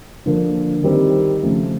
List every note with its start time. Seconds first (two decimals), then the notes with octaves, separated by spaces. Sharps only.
0.26 D3 F3 A#3
0.84 D#3 G3 C4 D#4
1.42 C#3 F3 A3